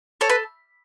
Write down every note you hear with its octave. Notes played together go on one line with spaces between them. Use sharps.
A4 C#5
B4